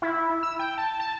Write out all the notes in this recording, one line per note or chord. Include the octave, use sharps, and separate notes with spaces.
E4
E6
G5
A5
A5